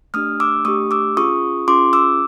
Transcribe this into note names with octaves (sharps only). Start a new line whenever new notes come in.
A3 D4 G4 D#6 F6
D6 E6
A3 D4 G4 C#6 D#6
D6 E6
C#4 F4 G#4 C#6 D#6
C#4 F4 G#4 C6 D6
D6 E6